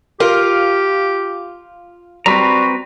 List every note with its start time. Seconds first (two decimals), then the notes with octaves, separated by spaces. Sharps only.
0.20 F4 G4 A#4
2.26 G3 C4 F#4 B4 A#5